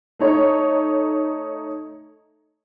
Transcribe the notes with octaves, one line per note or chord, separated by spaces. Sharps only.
A3 D#4 C#5